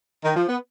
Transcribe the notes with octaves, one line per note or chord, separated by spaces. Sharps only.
D#3
F3
B3